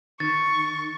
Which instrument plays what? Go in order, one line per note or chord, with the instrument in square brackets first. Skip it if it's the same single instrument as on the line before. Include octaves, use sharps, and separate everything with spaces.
[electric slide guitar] D#3 [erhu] C#6 [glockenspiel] A6